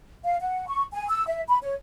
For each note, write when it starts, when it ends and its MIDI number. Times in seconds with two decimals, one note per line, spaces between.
0.24 0.37 77
0.41 0.68 78
0.68 0.84 85
0.93 1.07 80
1.09 1.26 88
1.28 1.42 76
1.48 1.58 83
1.62 1.75 73